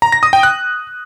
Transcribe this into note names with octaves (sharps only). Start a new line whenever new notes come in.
A#5
A#6
D#6
G5
F#6